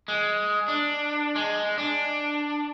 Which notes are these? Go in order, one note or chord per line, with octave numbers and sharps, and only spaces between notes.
G#3
D4
G#3
D4